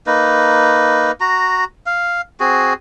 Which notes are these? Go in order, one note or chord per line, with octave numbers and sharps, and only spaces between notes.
A#3 D#4 B4
F#4 A#5
F5
C4 F#4 G#4